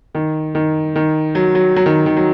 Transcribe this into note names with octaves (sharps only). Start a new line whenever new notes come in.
D#3
D#3
D#3
F#3
F#3
F#3
D#3
D#3
F#3